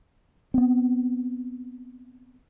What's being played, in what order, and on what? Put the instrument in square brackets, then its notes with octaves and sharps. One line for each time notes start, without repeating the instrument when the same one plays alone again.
[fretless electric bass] B3 C4